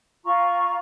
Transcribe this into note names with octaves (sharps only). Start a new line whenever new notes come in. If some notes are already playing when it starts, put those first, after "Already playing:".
F4 A#5 C#6